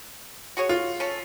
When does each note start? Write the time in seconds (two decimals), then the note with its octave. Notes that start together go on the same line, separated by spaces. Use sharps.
0.57 F#4 G#4 C#5
0.69 F4
1.00 C#4 A4